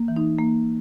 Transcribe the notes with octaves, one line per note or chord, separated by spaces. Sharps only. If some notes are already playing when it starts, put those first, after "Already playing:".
Already playing: A#3
E3
D#4
A#3